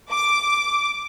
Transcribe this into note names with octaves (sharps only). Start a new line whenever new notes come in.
D6